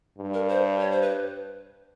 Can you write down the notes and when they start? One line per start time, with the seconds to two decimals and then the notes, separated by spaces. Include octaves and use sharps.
0.18 G2
0.34 A#4
0.50 C5
0.80 C#5
0.91 C5
1.02 B4